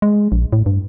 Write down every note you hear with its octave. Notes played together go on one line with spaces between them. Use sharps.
G#3
A#1
A2
G2